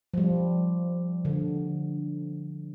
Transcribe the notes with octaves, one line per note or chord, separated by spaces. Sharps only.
F3 G3
D3